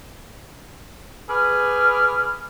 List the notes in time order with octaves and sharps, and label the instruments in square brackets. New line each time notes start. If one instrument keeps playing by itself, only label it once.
[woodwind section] G#4 B4 D6 F6